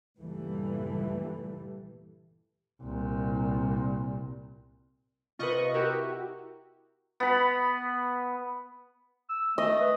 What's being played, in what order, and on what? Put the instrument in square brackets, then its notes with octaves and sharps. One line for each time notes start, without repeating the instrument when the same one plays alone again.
[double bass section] C#2 G2 A#2 E3 G3 A3
[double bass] C2 A#2
[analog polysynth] C3 D#5 C#6 [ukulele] F4 B4
[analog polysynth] E4 F#4 G4 [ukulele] A#4
[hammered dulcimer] B3 B5
[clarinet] E6
[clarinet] A3 [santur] D#5
[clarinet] B4